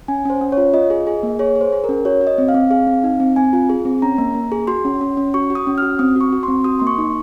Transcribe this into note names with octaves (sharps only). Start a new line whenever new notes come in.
C#4 G#5
C#4 C5
C#4
C#5
F4
F4 D#5
G#4
G#4
A#3
G#4 C#5
G#4
C5
G#4
A#4
C#4
F#4 C#5
F#4
D#5
C4
F5
C4
G#4 F5
C4
D#4
C4
C4 G#5
F4
G#4
C4
C#4 A#5
A#3
A#3
G#4
F#4 C6
C#4
C#4
C#4
F#4 C#6
F#4
D#6
C#4
F#4 F6
C4 D#6
F#4 C#6
F#4
C4 C6
F#4 D#6
A#3 C6
C#6
D#4